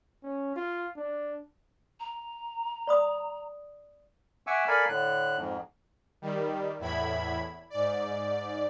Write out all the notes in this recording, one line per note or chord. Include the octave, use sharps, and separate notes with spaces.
C#4
F4
D4
A#5
D5 B5 D#6
E5 F#5 G#5 C#6 D6 E6
A4 A#4 D5 F5 G#5 B5
A2 D3 F#6
F2 G#2
D#3 G3
E2 A2 E4 B5 G#6
G#2 D5